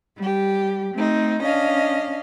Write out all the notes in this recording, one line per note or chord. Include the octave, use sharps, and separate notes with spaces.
G3 G4
A3 C4 D#4
C#4 D4 D#5 F5